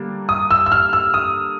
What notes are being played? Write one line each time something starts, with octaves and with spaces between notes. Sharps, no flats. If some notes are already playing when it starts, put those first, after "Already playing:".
Already playing: D3 G3 A#3 D4
D#6
E6
E6
F6
E6
D#6